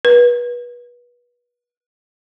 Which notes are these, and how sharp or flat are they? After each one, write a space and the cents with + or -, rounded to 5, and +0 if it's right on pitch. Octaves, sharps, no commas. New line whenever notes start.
B4 -30